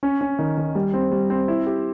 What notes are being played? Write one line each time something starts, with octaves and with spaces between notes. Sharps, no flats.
C#4
C#4
D#3
D#3
G3
C4
G3
C4
E4
G4